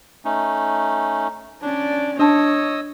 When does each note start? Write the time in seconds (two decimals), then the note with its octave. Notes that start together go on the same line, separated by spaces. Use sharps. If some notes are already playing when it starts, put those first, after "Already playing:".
0.25 A3 C#4 D#4
1.62 C#4 D4 D5
2.19 D4 C#5 D#5 A5 D#6 E6